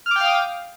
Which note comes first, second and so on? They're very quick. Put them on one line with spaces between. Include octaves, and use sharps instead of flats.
F6 D6 G5 F5 D#6